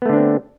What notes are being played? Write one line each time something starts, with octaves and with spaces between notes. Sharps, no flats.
D3 A3 B3 C4 D4